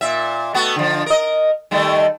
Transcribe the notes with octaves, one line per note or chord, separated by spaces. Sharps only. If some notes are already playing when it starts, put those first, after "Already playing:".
A#2 E5
A3 B3 F#4
D3 F3
A#4 D#5
D#3 G3 A3